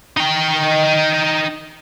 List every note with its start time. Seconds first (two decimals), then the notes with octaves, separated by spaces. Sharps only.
0.17 D#4 G5